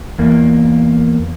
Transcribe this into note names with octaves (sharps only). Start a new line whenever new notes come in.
E2 A#3